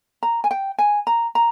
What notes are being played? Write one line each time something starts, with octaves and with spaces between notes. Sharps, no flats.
A#5
G#5
G5
G#5
A#5
A#5